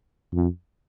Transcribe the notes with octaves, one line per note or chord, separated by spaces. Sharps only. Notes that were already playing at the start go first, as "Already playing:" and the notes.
F2